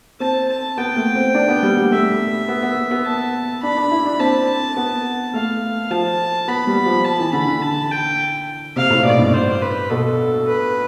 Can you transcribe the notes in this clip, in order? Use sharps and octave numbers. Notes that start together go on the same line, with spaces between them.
C4 A5
A5
B3 G5
A3
C4
D4
B3
G3
G3
A3 E5
B3
B3
B3
A5
D4 B5
D4
E4
D4
C4 A5
B3
A3 F5
F3 A5
B3 B5
G3
F3
A5
E3
D3 B5
D3
A5
G5
C3 F5
A2
B2 D5
G2
C5
B4
B2 A4
B4